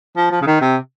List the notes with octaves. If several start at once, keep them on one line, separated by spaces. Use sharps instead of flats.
F3
F3
C#3
D#3
C3